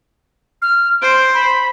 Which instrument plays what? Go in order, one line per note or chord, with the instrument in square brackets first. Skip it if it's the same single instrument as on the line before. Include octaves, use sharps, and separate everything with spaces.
[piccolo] F6
[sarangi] C5 [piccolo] D7
[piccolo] B5